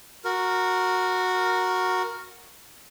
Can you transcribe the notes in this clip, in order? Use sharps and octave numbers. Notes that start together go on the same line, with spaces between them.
F#4 A#4